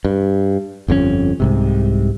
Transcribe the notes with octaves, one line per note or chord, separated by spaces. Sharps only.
G2
G1 F2 C3 C#4
C2 G#2 C3